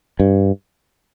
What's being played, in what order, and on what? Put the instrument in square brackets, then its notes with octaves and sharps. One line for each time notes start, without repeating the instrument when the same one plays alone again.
[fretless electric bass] G2